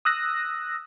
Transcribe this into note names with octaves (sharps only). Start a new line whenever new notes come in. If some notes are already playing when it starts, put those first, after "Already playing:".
D#6 E6 F#6 A#6